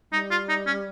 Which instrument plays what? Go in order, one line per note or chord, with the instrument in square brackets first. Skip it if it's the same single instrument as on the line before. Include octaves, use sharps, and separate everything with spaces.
[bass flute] G3 [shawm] D#4
[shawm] F4
D#4
C#4